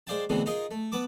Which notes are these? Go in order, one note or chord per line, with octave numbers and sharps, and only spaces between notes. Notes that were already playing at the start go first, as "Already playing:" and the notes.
G#3 C5 D5 F5 G5 A5
B2 D3 E3 G#3 A3 C4
D#4 F4 G#4 A#4 D#5
A3
B3 B4 A5 D6